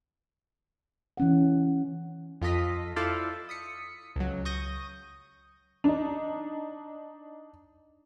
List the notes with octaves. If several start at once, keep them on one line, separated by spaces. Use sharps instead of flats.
E3 C#4 F#5
F2 F4 A4 D#5 B6
E4 F4 A4 C5 D5 F5
D#6 B6 C#7
C#2 F#3
C#6 D#6 G6 A#6 D#7
D4 D#4